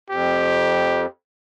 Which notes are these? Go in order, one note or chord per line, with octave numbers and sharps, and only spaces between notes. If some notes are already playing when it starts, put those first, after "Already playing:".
F2 G4